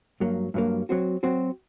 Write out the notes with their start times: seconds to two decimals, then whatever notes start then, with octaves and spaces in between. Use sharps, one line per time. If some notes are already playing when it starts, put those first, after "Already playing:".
0.20 G2 F#3 A#3
0.54 G2 F#3 A#3
0.89 F#3 C4 F#4
1.23 F#3 C4 F#4